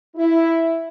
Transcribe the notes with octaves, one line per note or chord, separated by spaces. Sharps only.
E4